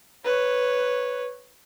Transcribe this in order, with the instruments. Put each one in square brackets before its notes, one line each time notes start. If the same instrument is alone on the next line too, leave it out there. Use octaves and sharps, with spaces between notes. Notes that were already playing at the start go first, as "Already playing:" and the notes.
[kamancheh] B4 C#5